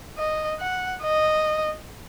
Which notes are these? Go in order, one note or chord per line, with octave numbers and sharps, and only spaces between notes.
D#5
F#5
D#5